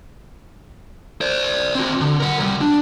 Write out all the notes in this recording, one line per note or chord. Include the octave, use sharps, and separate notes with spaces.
C5 D5
C4 F#4
D3
A#4 F#5
C2 G3
D4